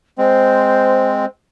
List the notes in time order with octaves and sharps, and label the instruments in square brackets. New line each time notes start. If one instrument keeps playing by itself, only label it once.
[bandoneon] G#3 C4 [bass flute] C5